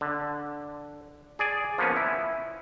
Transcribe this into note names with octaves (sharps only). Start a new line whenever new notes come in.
D3
G#4 D5 G#5
F3 A#3 B3 C#4
E4